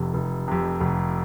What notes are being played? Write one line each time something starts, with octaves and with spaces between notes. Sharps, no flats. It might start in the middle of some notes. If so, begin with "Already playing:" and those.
Already playing: F1 F2 C3
F1
F2 C3
F1